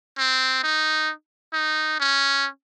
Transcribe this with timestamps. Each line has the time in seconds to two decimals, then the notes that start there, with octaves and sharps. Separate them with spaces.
0.18 C4
0.63 D#4
1.53 D#4
2.00 C#4